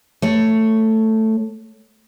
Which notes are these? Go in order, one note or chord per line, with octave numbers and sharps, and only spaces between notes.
A3 C#5